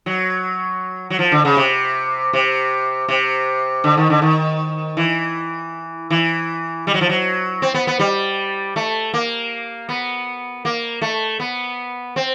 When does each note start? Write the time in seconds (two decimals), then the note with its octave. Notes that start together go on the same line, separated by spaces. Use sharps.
0.06 F#3
1.10 F#3
1.19 F3
1.32 D3
1.45 C#3
1.57 C3
2.33 C3
3.08 C3
3.84 D3
3.97 D#3
4.10 D3
4.22 D#3
4.97 E3
6.10 E3
6.87 G3
6.94 F#3
7.01 F3
7.09 F#3
7.62 C4
7.74 B3
7.87 B3
7.99 G3
8.76 A3
9.14 A#3
9.89 B3
10.65 A#3
11.02 A3
11.40 B3
12.16 C4